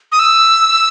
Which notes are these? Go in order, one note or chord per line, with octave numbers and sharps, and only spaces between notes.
D#6
E6